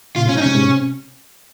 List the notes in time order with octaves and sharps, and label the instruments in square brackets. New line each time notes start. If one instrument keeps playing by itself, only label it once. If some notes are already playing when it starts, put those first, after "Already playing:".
[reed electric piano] A#2 C#3 [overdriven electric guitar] F4
[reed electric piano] G#2 C3 [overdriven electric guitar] C#4
[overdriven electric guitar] D#4
[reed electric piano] G#2 C3 [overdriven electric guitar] C#4
[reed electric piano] G#2 C3
C3